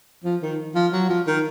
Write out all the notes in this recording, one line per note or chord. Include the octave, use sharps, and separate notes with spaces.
F3
D#3
F3
F#3
F3
D#3